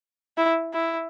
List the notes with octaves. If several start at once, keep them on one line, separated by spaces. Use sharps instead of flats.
E4
E4